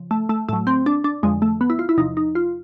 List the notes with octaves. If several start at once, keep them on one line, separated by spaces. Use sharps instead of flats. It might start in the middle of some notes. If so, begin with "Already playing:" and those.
Already playing: C#3 F3
A3
A3
A2 F#3 A3
C4
D4
D4
F2 D3 F3 G#3
A3
B3
E4
F4
E4
E2 C3 F3 D#4
D#4
F4